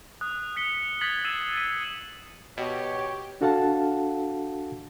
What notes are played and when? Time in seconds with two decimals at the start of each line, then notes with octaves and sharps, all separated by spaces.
0.21 D#6 F#6
0.56 F#6 B6 C#7 G7
1.01 D#6 F#6 G#6 A6 B6 F#7
1.24 E6 A6 C7 D#7 E7 F#7
1.56 G#6 B6 D#7
2.58 B2 G4 C#5
3.41 D4 F#4 A4 F5 F#5 A5